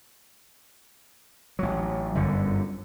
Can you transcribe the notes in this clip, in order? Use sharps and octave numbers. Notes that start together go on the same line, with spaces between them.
A1 F#3
G1 F#2 D3